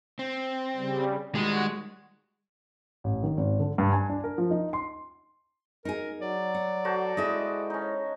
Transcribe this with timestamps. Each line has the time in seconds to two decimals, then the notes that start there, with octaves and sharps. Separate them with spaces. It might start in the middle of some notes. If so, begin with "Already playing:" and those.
0.19 C4
0.76 C#3 G3
1.35 D#3 G3 G#3 F#4
3.04 A1
3.23 D#3
3.37 G#1
3.60 D3
3.78 G2
3.93 G#5
4.10 D4
4.24 A#4
4.38 F3
4.51 D#4
4.73 C6
5.85 D#4 G#4 A#4
6.21 F#3 D5
6.55 F#5
6.85 F#4 A4 C5
7.17 G#3 E4 G#4 A4 D#5
7.70 C#4 D#4